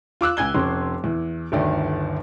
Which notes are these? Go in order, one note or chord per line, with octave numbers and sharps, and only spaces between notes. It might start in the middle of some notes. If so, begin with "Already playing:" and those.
F4 D6 E6 F#6
C#2 G#5 G#6 G7
F1 C#4 C6
E2
G1 D2 D#3 D5